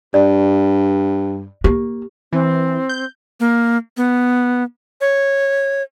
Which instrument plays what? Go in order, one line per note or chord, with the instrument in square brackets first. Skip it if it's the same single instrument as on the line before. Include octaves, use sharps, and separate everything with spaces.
[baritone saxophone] G2 [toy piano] D5
[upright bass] A#3 [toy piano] G4
[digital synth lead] E3 [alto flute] C4
[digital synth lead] G6
[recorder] A#3
B3
C#5